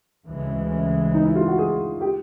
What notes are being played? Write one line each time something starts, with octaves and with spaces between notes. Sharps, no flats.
D2 C#3 E3 G#3
D#4
E4
F4
F#4
G#4
G4